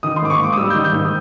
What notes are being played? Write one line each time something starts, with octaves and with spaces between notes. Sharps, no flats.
D#3 D#6
C6
G#2 D6
C#6
A#3 D6
D#6
G3 E6
G6
D#3
G6
G#2
D#6